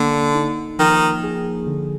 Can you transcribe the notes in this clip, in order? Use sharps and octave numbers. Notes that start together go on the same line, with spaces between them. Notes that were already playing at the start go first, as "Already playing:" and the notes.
Already playing: D3 A#3
D#4
D#3 F3
G#4
D3